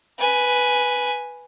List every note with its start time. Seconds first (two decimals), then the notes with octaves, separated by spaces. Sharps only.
0.18 B4 G#5